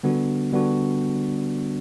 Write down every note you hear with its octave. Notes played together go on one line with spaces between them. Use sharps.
D3 G3 B3 D4 F#4
D3 G3 B3 D4 F#4